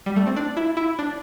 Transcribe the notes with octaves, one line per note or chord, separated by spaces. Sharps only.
G3
A3
C4
D4
E4
E4
D4